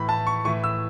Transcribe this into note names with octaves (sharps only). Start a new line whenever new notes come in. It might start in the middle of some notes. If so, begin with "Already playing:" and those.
Already playing: A2 E3 B5
A5
C#6
A2 E3 C#6
E6